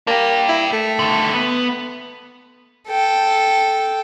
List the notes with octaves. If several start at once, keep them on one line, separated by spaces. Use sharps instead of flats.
A#3 D4 G4
E4
A3
D3 D#3
B3
A4 G5